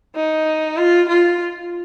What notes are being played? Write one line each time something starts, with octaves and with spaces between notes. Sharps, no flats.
D#4
F4
F4